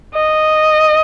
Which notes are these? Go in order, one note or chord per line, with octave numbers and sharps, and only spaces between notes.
D#5